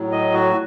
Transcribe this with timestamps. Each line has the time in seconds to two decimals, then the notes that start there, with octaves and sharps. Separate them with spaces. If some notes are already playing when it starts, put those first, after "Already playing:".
Already playing: A2 F#3
0.12 D#5
0.34 F#4